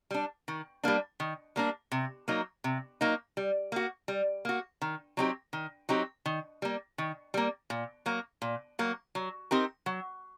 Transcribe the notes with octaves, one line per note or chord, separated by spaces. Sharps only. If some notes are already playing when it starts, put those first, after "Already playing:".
G3 D4
D#3
G3 A#3 D4
D#3
G3 A#3 D4
C3
F#3 A#3 D#4
C3
F#3 A#3 D#4
G3
A#3 F#4
G3
A#3 F#4
D#3
F#3 C4 D#4 G4
D#3
F#3 C4 D#4 G4
D#3
G3 A#3
D#3
G3 A#3
A#2
F#3 A#3
A#2
F#3 A#3
F#3
C4 D#4 G4 A#4
F#3